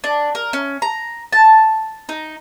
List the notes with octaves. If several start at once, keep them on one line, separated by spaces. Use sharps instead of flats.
D4
A#4
C#4
A#5
A5
D#4